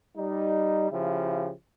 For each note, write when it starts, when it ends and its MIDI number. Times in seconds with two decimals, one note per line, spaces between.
0.16 0.89 55
0.16 0.89 63
0.92 1.51 49
0.92 1.51 53
0.92 1.51 64
0.92 1.51 67